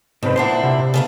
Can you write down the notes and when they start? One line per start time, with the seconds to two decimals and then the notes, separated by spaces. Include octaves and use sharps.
0.23 F2 G#2 C3 B4
0.36 A#2 D4 E4 C5 F#5
0.63 C3
0.94 C#3 A3 B3